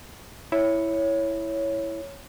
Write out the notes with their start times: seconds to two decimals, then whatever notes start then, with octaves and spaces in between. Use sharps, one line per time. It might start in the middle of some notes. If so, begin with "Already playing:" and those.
0.52 E4 C#5